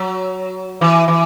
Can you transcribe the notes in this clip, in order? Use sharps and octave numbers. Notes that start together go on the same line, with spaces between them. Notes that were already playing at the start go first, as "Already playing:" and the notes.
Already playing: F#3
E3
E3